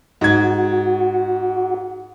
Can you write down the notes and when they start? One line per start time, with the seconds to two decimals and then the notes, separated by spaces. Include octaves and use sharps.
0.21 G#2 F#4 G#6